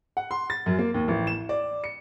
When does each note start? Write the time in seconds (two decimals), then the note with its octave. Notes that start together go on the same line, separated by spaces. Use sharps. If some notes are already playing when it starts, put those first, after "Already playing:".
0.17 F#5
0.31 C6
0.50 A6
0.66 F#2
0.78 A#3
0.94 D#2
1.08 A1
1.27 E7
1.49 D5
1.84 C#7